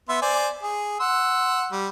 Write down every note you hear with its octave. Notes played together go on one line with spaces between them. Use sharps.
B3 E5 C6
C5 D5 G#5
G#4
F#5 C6 E6
G3